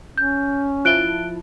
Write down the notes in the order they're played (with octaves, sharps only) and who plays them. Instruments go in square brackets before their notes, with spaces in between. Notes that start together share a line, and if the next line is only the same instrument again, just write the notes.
[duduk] C#4 [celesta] G6
[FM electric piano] F3 E4 A5 [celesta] F#6 D7 G7